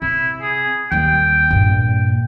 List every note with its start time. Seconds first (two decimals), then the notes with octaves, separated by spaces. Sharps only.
0.02 C3 E4
0.42 G#4
0.92 D#2 G3 G5
1.51 G2 A#2